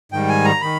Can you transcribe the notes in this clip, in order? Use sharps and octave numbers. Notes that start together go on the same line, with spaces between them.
G#2 D#3 G3 G5
G#5
A#5
D#3 B5